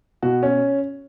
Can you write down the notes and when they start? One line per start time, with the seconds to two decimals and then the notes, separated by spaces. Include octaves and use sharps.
0.23 B2 F#4
0.43 C#4